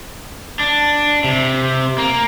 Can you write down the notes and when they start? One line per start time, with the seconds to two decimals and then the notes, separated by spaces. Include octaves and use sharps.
0.59 D4
1.24 C3
1.98 A#3